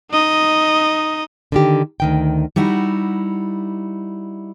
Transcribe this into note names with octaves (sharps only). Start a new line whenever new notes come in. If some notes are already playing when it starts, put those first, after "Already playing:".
D#4 D#5
D3 D#3 G4
D2 D#3 G5
G3 D#4 E4 F#4